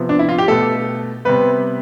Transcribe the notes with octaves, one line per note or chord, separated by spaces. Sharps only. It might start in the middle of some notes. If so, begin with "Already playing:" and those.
Already playing: C3 F3 B3
D4
E4
F4
G4
B2 A3 A4
C3 G3 B3 B4